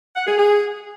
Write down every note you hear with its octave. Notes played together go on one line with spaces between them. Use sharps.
F#5
G#4
G#4